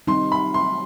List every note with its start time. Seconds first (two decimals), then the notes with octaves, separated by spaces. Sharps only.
0.07 G3 C4 D#4 C6
0.32 B5
0.54 C6